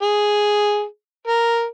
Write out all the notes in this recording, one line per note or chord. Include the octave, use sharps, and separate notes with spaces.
G#4
A#4